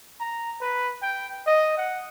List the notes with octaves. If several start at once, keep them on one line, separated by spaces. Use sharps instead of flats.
A#5
B4
G5
D#5
F#5